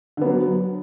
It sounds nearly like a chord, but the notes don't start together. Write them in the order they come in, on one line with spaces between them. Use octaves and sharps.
D3 B3 F#3